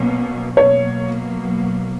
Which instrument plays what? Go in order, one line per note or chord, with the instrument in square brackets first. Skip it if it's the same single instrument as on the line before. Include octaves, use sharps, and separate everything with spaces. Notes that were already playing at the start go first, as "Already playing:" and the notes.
Already playing: [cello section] B2 F#3 A#3 C#4
[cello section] B2 F#3 A#3 [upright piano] C#5